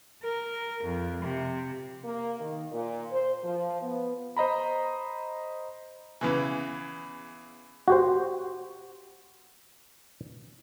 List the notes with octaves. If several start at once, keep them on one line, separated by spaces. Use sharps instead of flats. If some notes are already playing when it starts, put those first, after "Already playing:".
A#4
F2
C3
A#3
D#3
A#2
C5
F3
B3
C5 D#5 A#5 B5
E2 C#3 E3
F#4 G4 C5